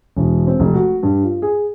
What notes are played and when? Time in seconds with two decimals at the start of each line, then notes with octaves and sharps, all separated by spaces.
0.17 E1
0.47 C4
0.60 F1
0.74 F#4
1.03 G2
1.23 F4
1.42 G#4